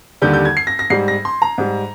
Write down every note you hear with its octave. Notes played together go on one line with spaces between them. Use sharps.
D#2 D3 G3 G6
G6
G#6
C7
A#6
A#6
G#2 G3 C7
A#6
C6
A#5
G#2 G3